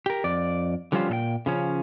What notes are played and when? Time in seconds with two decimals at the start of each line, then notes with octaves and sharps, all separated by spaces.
0.06 G4 A#4
0.24 F2 D5
0.92 D3 F3 G3 C#4 F4 C5
1.09 A#2 A4 G5
1.46 C#3 F3 C#4